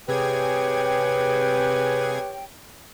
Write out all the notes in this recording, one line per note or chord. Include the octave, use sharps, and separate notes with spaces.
C3 G4 G#4 B4 C#5 G5 G#6